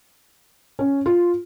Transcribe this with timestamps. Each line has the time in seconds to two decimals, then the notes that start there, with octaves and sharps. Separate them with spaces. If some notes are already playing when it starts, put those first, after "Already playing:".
0.79 C#4
1.06 F4